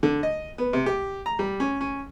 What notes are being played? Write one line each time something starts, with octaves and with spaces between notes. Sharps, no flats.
D3
D#5
B3
C3
G4
A#5
G3
C#4
C#4